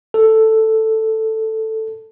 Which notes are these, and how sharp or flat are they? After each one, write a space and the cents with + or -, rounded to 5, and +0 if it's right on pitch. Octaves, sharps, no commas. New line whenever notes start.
A4 +5